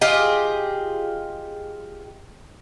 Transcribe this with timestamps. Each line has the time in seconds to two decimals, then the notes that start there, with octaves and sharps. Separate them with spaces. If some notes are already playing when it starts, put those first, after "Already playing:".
0.01 F4 G4 G#4 D#5